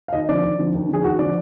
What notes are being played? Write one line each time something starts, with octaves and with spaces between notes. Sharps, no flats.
F5
D#2 D#5
D3 F3 D5
D#2
D3 F3
D#2
D3 F3 G#4
D#2 F#4
D3 F3 D5